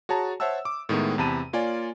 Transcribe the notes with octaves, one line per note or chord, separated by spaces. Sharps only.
F#4 G#4 C#5 A5 A#5
C5 C#5 E5 F#5 A5 E6
D6
A2 D#3 G#3 B3
E2 C3 A5 B5 D#7
A#3 F4 C#5 D5 G#5